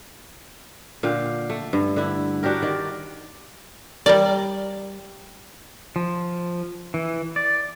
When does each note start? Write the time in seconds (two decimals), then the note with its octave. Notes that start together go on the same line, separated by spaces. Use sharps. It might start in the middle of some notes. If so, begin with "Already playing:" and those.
1.03 A#2 D3 F5 G5
1.50 A3
1.73 G2
1.96 D3 E4
2.43 D4 F#4 G4 A#4
2.62 D#3 D5
4.06 G3 A#4 D5
5.96 F3
6.94 E3
7.36 D5